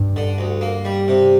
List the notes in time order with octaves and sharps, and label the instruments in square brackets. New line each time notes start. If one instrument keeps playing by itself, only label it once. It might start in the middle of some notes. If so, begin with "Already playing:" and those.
Already playing: [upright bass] G2
[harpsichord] D3
D2
A#3
G3
C3